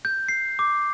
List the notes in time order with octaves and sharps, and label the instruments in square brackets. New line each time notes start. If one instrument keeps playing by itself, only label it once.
[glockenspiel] G6
C7
D6